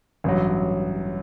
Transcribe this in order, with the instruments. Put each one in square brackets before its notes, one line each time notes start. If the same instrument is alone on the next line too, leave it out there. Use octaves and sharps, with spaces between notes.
[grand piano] A1 G2 F#3